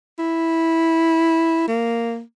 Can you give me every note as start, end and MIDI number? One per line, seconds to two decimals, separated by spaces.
0.19 1.67 64
1.68 2.21 58